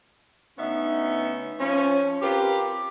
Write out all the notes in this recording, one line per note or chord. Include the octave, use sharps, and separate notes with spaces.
D2 B3 C#4 D#4 E5
F3 C#4
C4 F4 G4 A#4 B4